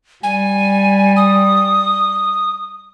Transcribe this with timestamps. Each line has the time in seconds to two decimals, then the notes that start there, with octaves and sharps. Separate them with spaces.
0.23 G3 G#5
1.17 D#6